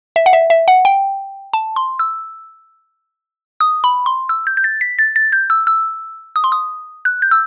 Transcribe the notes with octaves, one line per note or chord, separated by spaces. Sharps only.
E5
F#5
E5
E5
F#5
G5
A5
C6
E6
D#6
B5
C6
E6
G6
G6
A6
B6
A6
A6
G6
E6
E6
D#6
C6
D#6
F#6
G6
E6